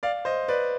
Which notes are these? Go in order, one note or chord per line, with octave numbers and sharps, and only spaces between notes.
D5 F5
C5 D#5
B4 D5